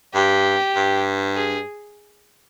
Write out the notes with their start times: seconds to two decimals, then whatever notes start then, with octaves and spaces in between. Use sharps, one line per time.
0.14 G2 G4
0.75 G2
1.36 G#4